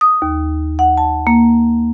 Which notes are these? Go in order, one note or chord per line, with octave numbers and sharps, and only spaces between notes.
D#6
D#2
F#5
A5
A#3